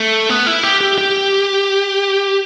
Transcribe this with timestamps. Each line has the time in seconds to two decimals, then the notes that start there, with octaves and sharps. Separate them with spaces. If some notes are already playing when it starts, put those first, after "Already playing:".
Already playing: A3
0.29 B3
0.47 E4
0.63 G4
0.81 G4
0.98 G4